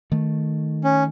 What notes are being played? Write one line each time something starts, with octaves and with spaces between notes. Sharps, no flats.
D#3 A3
C#4